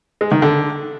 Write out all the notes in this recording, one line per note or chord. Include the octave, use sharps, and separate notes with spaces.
G#3
D#3
D3